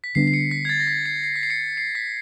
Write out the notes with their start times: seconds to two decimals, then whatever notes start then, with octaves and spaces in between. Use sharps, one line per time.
0.04 B6
0.15 D3 G3 B3 D4 C7
0.28 C7
0.33 C#7
0.51 B6
0.65 G#6
0.69 A6
0.80 A#6
0.87 B6
1.06 C7
1.23 C7
1.36 B6
1.43 C7
1.50 C#7
1.77 C7
1.95 B6